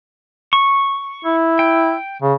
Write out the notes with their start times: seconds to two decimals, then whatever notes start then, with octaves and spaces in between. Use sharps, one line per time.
0.53 C#6
1.25 E4
1.59 G5
2.22 C#3